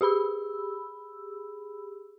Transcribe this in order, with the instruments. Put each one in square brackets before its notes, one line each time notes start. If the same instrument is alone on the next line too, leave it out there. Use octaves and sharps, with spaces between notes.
[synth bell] G4 G#4 B5 E6